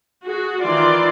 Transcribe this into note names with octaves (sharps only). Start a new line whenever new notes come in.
F#4 G#4
D#3 E3 F4 D5 C6